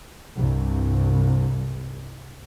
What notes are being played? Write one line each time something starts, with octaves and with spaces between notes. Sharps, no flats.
C2 G2 C3